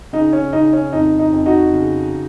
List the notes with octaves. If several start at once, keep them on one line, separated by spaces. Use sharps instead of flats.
C#3 D#4
C#4
C#3 D#4
C#4
F2 D#4
D#4
F2
D#4 F#4
C#3